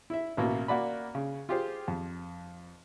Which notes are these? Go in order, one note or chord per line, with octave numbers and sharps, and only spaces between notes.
E4 E5
A1 B2 A#3 E4
A#3 F#4 D5 B5
C#3
F4 G4 G#4 C5
F2